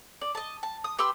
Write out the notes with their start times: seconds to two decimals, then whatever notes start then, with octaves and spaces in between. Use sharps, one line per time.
0.21 D5
0.35 D#5 A5
0.63 A5
0.84 D#6
0.99 G4 B4 C6 E6